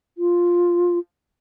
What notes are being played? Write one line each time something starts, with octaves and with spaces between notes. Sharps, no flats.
F4